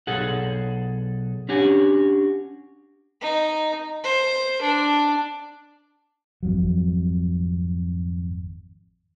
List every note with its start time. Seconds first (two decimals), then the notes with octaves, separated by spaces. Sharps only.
0.07 B1 G#4 A4 F#5
1.49 C#4 D4 F#4 G4 G#5
3.21 D#4
4.04 C5
4.61 D4
6.43 G#1 F2 F#3